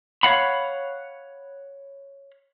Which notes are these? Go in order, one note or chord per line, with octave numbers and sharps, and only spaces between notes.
C#5 D5 F5 F#5 B5